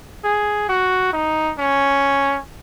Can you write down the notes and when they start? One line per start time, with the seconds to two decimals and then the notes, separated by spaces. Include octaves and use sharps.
0.24 G#4
0.69 F#4
1.13 D#4
1.58 C#4